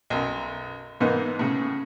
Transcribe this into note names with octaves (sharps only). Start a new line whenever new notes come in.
B1 F#2
G#2 E3 A#3 B3 D#4
A2 C#3